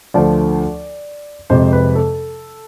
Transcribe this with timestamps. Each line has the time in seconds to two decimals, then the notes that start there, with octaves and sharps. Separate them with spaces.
0.14 D2 D3 F3 A3 D5
1.50 F2 C3 G#3 C5
1.73 B4
1.95 A4